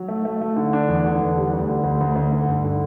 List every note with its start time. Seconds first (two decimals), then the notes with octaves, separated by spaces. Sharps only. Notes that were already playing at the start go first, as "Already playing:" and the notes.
Already playing: F#3
0.08 A3
0.25 A3
0.41 A3
0.56 D3
0.73 D4
0.88 E2
1.04 D3
1.20 E2
1.37 G3
1.53 D2
1.68 D3
1.84 D2
2.01 D2
2.16 D2
2.32 D3
2.48 G2
2.64 D3